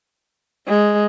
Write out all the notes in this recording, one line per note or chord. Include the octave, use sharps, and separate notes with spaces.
G#3